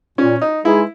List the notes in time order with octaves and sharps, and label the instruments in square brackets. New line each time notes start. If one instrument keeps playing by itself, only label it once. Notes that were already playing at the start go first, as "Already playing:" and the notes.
[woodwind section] A#2 [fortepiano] C#4
[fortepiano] D#4
[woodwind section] G#3 D#4 G#4 B4 [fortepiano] E4